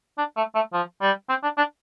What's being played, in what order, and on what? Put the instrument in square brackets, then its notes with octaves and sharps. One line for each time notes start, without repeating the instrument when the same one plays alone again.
[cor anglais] D4
A3
A3
F3
G3
C4
D4
D4